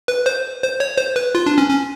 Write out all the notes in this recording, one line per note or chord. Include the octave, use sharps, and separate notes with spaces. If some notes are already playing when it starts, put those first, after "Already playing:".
B4
C5
C5
C#5
C5
B4
F4
D4
C#4
C#4